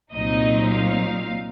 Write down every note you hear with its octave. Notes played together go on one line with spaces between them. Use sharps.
C2 A#2 F#3 C4 D#4 D#5
F5